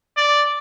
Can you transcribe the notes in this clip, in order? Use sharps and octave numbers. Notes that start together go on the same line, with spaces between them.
D5